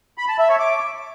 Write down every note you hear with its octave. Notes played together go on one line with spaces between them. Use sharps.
B5
A5
E5
C#5
D6